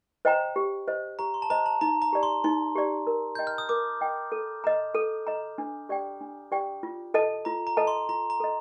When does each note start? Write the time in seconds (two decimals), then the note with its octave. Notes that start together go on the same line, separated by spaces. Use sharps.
0.25 C5 D#5 G5 A#5
0.56 G4
0.88 C5 D#5
1.19 G4 A#5
1.34 C6
1.42 A5
1.50 C5 D#5 A#5
1.66 A5
1.81 D#4 A#5
2.02 A#5
2.13 G4 D5
2.23 C6
2.44 D#4 C6
2.75 G4 D5
3.07 A#4
3.35 D#5 G5 G6
3.47 F6
3.58 D#6
3.69 A#4 D6
4.01 D#5 G5
4.32 A4
4.64 D#5 A#5
4.95 A4
5.27 D#5 A#5
5.58 D4
5.89 G4 D5 G5
6.21 D4
6.52 G4 D5 G5
6.83 F4
7.14 A4 D#5 A5
7.45 F4 A#5
7.67 A#5
7.77 A4 D#5 A5
7.87 C6
8.09 F4 A#5
8.30 A#5
8.40 A4 D#5